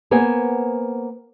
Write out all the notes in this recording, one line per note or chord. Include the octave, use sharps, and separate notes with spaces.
A#3 B3 C5 G#5